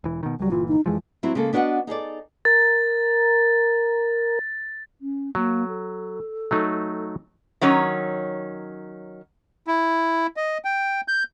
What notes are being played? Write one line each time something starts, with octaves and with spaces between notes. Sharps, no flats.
E1 E3
B2 D#3
C#2 F#3 G3
G1 A#2 E3 F4
D#4
F2 E3 F3 G#3
F#3 G3 C4 E4
C#3 G#3 A#3 A4
B3 D4 F#4 C#5 D#5 F#5
D#4 G#4 A4 D5
A#4 A6
C#4
F#3 A#3
A4
F#3 A3 D#4
D#3 F#3 C#4 C#5
E4
D#5
G5
G6